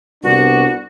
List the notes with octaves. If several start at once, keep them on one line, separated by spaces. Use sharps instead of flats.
C2 B3 D4 F#4